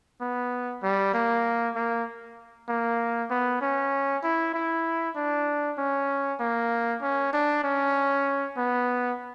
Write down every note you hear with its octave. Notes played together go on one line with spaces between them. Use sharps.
B3
G3
A#3
A#3
A#3
B3
C#4
E4
E4
D4
C#4
A#3
C#4
D4
C#4
B3